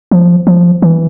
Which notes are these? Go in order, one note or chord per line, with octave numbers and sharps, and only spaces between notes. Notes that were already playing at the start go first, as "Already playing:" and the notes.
F3
F3
E3